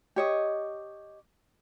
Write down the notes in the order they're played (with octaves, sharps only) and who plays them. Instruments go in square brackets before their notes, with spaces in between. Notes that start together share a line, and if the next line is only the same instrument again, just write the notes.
[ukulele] G4 C#5 D#5